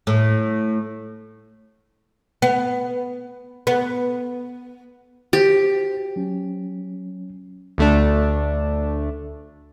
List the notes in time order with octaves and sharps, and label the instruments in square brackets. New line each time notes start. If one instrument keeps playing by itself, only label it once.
[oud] A2
B3
B3
[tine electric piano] F#4 C5 [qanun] G4
[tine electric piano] F#3 C#4
[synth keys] D2 A3 D4